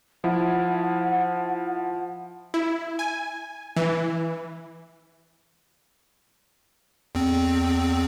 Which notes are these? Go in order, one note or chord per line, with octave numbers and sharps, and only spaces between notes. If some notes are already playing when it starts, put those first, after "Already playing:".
F3 E4 F#5
E4
G#5
E3
E2 C4